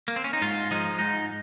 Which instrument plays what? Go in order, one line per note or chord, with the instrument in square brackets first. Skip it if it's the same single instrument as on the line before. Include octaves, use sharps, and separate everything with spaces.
[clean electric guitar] A#3
C4
C#4
D#4
G#2 F4
F3 G#3 D#4
G#2 D#4